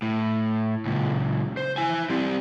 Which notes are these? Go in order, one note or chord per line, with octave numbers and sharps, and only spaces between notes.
A2
C#2 A#2
C5
E4 G#5
G3 C4